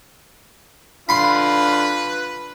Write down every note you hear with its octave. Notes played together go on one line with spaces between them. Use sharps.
D3 F4 B4 B5 C6